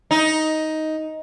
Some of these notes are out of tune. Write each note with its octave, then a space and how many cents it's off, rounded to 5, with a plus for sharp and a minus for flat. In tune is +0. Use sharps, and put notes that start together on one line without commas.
D#4 +10